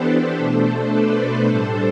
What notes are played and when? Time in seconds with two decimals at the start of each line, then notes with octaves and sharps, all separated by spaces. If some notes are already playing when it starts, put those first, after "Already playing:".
Already playing: E3 B3 D4 G4 A4 B4 C5
0.37 B2 A3 D4 A4 C5
0.91 B4 D5
1.46 A2 G3 D4 A4 C5